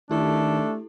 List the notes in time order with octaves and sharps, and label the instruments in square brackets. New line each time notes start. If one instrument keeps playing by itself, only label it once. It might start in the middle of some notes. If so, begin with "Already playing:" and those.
[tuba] D#3 [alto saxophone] A3 [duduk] D4 [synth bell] E4 G4 A4